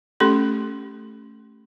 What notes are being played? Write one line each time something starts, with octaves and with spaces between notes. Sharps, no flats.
A3 C#4 G4 A4 C6